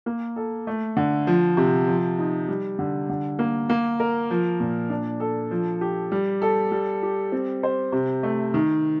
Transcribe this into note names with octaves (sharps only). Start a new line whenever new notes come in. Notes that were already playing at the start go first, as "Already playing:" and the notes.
A#3
A4
A3
D3
F3
C3
F3
D#4
G3
D3
D3
A#3
A#3
A#4
F3
A#2
D4
A4
F3
G4
G3
A4
G3
G4
C4
C5
C3
A3
D#3